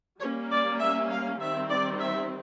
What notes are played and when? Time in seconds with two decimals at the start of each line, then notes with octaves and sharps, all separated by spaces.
0.21 G3 A#3 C#4 C#5
0.51 D5
0.80 E5
1.10 F5
1.39 D#3 G3 C4 E5
1.70 D5
1.99 E5